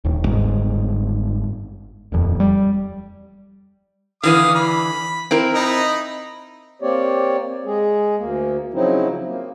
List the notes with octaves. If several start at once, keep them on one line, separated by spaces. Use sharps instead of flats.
D1 D#2
G1 G#2
D#1 F2
G3
D3 E3 B4 F5 D#6
B5
C4 E4 A#4
D#4 B5
A#3 C4 G4 C#5 D5
G#3 G#4
D2 A#3
C#3 F3 F#3 C4 D#4 E4
A#3